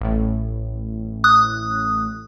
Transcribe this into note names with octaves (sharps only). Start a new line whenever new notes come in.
A1 A2
D#6 F#6